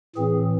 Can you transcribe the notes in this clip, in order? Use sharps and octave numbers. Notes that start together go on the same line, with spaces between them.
A2 E3 C4 G#4